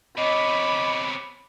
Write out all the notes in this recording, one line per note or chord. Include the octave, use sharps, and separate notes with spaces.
C3 B3 C#5 D#5 B5 D6